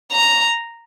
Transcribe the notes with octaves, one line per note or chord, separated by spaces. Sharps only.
A#5